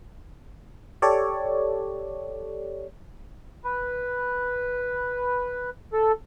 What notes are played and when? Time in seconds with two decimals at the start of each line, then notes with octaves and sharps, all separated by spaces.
1.02 G4 A4 C#5 D5
3.65 B4
5.93 A4